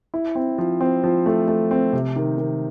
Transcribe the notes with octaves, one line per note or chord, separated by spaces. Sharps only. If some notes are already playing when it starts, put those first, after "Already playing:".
E4
C4
F3
C4
F3
A3
A3
C4
C3
D#3
D#3